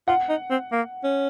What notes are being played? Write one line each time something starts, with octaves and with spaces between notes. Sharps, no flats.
F4 F#5
D#4
C4
A#3
C#4